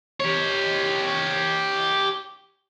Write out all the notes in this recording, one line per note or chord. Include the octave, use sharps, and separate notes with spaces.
G4 C#5